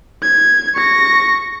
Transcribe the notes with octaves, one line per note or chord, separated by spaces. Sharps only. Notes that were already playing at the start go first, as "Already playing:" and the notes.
G#6
C#6 A#6